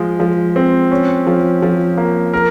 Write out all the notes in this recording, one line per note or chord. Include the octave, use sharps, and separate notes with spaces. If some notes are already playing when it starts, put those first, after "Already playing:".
Already playing: F3 G#3
F3
C4
C#4
F3
F3
A#3
A#4